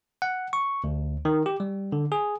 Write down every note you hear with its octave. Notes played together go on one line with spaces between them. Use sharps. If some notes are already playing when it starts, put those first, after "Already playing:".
F#5
C#6
D2
D#3
G4
G3
D3
G#4